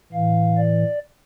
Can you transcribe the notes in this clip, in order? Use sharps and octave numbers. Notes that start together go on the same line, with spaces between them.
A2 E3 F5
D5